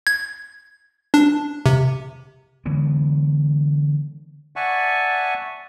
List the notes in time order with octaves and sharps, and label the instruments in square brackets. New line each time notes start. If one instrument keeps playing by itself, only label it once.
[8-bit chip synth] G#6
D4
C3
[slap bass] D3 E3 G#3 B3
[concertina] D5 E5 F#5 G#5 A5 C#6